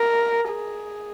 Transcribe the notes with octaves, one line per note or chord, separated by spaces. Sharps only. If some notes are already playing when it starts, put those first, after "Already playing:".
Already playing: A#4
G#4